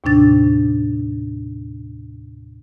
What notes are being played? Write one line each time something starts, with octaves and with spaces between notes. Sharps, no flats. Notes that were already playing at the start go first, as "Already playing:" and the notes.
D#2 A2 C3 D4 A6